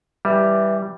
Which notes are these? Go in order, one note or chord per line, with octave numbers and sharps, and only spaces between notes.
E3 G3